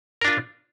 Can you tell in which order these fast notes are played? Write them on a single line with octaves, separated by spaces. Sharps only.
A#4 D4 F4